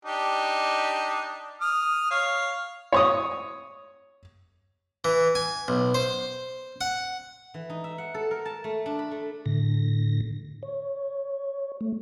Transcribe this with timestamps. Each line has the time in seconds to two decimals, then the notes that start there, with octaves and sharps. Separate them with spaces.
0.05 D4 D#4 G4
1.61 D#6 F6
2.10 C#5 F5
2.92 C#5 C#6 D#6
5.04 E3
5.35 G#5
5.68 B1
5.94 C5
6.81 F#5
7.54 E3
7.70 D#4
7.84 E5
7.98 F#5
8.14 A4
8.31 A#4
8.45 A5
8.64 A3
8.86 D4
8.99 B5
9.11 A3
9.46 A2 D3 A#6
10.63 C#5
11.81 A3